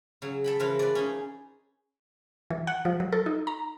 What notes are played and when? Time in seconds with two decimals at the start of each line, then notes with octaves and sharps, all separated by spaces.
0.22 C#3 F#3
0.44 A4 G5 B5
0.59 C#3 E3 F3 F4 A#4 B4
0.79 B4 D5
0.95 C#4 D#4 G#4
2.50 E3
2.67 F#5
2.85 F3
3.00 F#3
3.12 A4
3.26 D#4
3.47 A#5